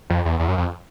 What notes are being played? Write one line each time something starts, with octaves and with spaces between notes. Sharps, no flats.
F2
E2
E2
F#2
F2